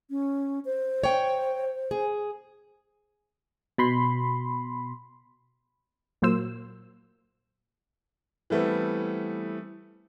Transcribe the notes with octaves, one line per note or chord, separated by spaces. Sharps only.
C#4
C5
C#5 G5
G#4
B2 B5 C6
A#2 F#3 A#3 C5 E6
E3 G3 A3 B3 C4